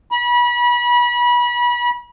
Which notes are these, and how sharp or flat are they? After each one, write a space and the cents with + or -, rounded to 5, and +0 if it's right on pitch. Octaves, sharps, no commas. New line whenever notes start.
B5 -30